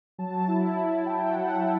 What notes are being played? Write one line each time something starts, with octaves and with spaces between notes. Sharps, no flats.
F#3 A5
E4
E4
F#3 G5
F#5
F#3
E5